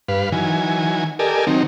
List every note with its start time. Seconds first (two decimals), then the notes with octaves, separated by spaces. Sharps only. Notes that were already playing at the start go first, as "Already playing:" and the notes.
0.08 G2 B4 F5
0.32 D#3 E3 F#3 G#5
1.19 G4 A4 A#4 D5 D#5 G#5
1.47 D#3 F#3 C4 D#4